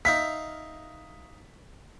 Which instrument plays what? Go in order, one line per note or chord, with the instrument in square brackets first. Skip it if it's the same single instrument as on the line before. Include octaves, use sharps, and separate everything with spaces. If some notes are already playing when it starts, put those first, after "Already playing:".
[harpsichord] D#4 E5 F5 [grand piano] B6